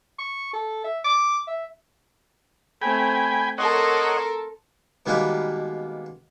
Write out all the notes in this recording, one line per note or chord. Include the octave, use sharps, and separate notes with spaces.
C#6
A4
E5
D6
E5
A3 C4 G5 G#5 B5
A4 A#4 C#5 D#5 F#5 C6
B2 D#3 G3 G#3 A#3 B4